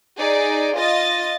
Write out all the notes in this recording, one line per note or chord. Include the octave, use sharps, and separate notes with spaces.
D#4 G#4 D5
F4 D#5 A6